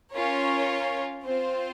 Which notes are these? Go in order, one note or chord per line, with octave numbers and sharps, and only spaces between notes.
C#4 F4 A#4 C#5
C4 F4 C5